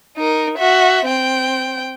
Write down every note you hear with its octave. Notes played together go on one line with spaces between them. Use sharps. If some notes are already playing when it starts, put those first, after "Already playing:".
D#4 A#4
F#4 E5
C4 G5